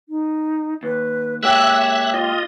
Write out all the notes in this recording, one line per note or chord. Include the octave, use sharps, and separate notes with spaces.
D#4
D#2 B4
G#3 A#3 G4 C#5 E5 E6 F#6
F4 D#5